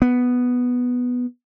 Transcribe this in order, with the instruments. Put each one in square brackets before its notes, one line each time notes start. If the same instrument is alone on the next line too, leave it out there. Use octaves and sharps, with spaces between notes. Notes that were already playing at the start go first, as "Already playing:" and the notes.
[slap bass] B3